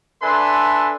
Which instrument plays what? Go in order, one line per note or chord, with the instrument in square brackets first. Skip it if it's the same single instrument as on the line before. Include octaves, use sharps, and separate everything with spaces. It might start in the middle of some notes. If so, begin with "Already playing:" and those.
[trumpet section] D4 A4 B4 E5 G#5 C6